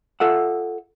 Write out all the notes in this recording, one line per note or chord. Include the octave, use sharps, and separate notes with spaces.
F4 A4 E5 F#5